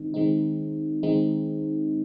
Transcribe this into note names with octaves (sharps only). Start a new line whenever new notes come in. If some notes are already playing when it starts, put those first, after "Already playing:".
Already playing: D#3 G#3 C4 D#4
D#3 G#3 C4 D#4
D#3 G#3 C4 D#4